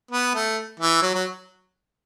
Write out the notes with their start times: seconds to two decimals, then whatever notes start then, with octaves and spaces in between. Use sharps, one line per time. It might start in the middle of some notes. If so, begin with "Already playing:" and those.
0.11 B3
0.35 A3
0.80 E3
1.02 F#3
1.14 F#3